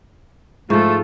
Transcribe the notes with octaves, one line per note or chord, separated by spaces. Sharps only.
G#2 F3 A3 F4 A4